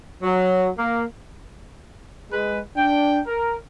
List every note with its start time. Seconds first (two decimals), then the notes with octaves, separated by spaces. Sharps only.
0.23 F#3
0.78 A#3
2.31 G#3 B4
2.77 D4 G5
3.27 A#4